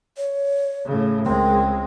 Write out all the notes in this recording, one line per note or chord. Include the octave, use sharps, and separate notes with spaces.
C#5
A2 C#3
C#2 G#3 C4 A#4